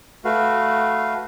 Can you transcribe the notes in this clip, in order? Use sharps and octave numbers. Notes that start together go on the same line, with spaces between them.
A3 F#4 B4 F5